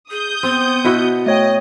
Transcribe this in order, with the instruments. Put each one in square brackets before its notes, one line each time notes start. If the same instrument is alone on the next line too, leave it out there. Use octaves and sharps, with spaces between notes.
[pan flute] G#4 [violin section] D#6 G6
[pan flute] B3 [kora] C4
[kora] B2 E4 F#4
[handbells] A3 C#5 G5 [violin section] D#5